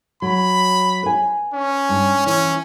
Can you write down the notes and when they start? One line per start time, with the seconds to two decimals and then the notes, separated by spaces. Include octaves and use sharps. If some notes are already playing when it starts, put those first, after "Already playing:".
0.22 F#3 B5
1.03 B4 G#5
1.53 C#4
1.89 G2
2.26 E3 C#4